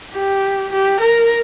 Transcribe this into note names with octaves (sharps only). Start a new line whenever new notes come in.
G4
G4
A#4